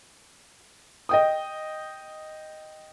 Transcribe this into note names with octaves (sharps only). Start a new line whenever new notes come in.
D#5 G5 D#6